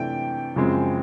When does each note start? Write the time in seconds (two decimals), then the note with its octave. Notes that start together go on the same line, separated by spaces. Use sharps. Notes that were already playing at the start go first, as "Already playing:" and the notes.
Already playing: C3 E3 A3 D4 G5
0.56 F#2 C#3 F3 G#3 C4